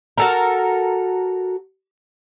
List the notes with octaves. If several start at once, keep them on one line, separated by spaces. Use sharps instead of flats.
F#4 A4 A#4